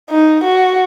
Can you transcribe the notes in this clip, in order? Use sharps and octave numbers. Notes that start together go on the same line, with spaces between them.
D#4
F#4